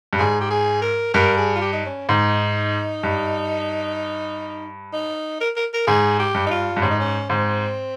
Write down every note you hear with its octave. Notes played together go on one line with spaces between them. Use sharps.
G2
G#2 G#4
G4
G#4
A#4
G2 A#4
G#4
F4
G4
D#4
C#4
G#2 D#4
G2
D#4
A#4
A#4
A#4
G#2 G#4
G4
G2
D#4
F4
G2
G#2 C#4
D#4
C#4
G#2 C4